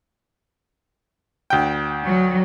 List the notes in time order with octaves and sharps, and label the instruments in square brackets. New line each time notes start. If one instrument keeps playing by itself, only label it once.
[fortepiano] D2 G5
[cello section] F#3